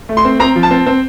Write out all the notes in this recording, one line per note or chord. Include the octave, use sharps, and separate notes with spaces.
A3
C6
C4
C4 A#5
F3
A5
C4
C4